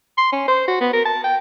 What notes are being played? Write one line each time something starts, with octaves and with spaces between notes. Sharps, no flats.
C6
C#4
C5
F#4
B3
A#4
A5
G5